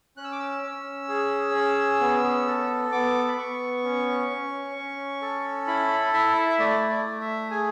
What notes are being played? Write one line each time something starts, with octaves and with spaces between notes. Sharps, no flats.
C#4 F#6
E6
D6
E6
C#4
G#4
C#4
B3
A4
B3 D6
B5
B3 C#6
C#4
C#4
C#4
A4
E4 B5
E4 E5
A3 D5
D5
A3
E5
G#4 G#5